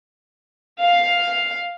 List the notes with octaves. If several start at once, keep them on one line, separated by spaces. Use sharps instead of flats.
F5